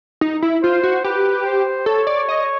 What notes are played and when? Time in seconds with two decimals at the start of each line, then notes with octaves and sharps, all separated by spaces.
0.21 D#4
0.42 E4
0.63 F4 C5
0.83 F#4
1.04 G4 B4
1.46 C5
1.86 A4 C#5
2.07 D5
2.29 D#5